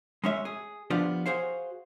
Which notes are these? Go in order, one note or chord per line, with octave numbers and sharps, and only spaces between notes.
G#3 C#4 E5
G#4
F3 B3 D4 F4 G4
F#4 G#4 C5 F5